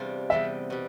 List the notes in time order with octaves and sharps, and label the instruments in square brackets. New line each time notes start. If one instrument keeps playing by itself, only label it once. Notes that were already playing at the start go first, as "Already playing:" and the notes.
Already playing: [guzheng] E2 C3 G3 D4 F4
[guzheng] E2 C3 G3 [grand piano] E5
[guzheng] B2 G3